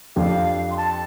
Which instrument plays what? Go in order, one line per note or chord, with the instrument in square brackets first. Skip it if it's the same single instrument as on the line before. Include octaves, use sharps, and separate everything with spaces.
[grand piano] F2 F3 D4 G4 [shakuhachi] F5
[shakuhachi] C6
A5